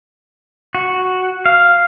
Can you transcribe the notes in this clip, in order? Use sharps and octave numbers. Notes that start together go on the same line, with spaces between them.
F#4
F5